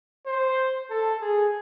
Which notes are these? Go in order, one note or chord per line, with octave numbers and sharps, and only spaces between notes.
C5
A4
G#4